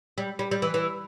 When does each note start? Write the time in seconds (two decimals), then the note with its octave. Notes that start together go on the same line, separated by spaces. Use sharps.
0.18 G3
0.39 G3
0.51 G3
0.62 E3
0.74 E3